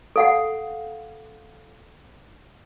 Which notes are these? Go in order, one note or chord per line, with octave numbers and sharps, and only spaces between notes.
A4 F5 F#5